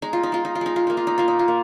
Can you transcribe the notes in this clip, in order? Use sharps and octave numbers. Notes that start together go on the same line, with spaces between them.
G#3 D#4
F4
D#4
G#3 F4
D#4
F4
G#3 D#4
F4
A#3 D#4
F4
D#4
A#3 F4
D#4
F4
A#3